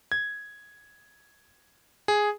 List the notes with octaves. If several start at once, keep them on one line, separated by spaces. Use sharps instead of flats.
G#6
G#4